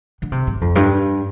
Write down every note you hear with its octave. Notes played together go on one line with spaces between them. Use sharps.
D3
C3
G#2
F2
G2